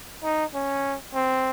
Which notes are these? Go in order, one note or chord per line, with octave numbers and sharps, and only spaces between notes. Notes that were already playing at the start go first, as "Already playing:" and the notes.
D#4
C#4
C4